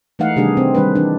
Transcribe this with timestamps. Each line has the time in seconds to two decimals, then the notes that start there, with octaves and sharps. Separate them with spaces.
0.19 E3 G#3 A3 D#4 F5 F#5
0.36 C3 D#3 G3 A3 D4 G#4
0.57 C3 C4
0.75 D#3 G3 G#3 D4 B4
0.95 E3 D4